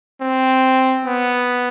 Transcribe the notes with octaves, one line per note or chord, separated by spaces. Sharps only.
C4
B3